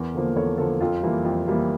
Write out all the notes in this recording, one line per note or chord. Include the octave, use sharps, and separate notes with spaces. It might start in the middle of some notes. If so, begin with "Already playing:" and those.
Already playing: E2 A#4
D3 F3 A#3
E2 A4 C#5
D3 F3 A#3 F4 A4
F2 F4 A4
E3 G3 A#3
F2
E3 G3 A#3